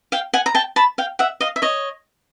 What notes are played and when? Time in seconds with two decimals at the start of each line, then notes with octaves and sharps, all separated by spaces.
0.12 F5 G5
0.33 F#5 G#5
0.46 A#5
0.55 G5 A5
0.76 A5 B5
0.98 F5 G5
1.19 E5 F#5
1.41 D#5 F5
1.56 E5
1.62 C#5 D#5